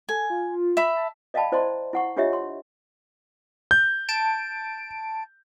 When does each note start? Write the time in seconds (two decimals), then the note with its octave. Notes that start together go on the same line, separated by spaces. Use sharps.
0.09 A4 G#5
0.30 F4
0.77 E5 B5
0.96 A5
1.34 D5 D#5 F5 G5 A5 B5
1.52 E4 C5 D5 D#5 A5 C6
1.93 E4 F#5 C#6
2.17 D4 F4 G4 C#5 D#5 E5
2.33 C6
3.71 G6
4.09 A5 D7